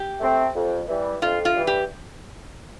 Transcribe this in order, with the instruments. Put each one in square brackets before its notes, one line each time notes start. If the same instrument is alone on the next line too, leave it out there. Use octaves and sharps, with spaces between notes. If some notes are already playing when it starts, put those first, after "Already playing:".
Already playing: [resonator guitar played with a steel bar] G4
[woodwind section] A3 C4
F2
E3 G3
[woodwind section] F2 [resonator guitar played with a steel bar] F4
[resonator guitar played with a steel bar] F4
[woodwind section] E3 G3
[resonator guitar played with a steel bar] G4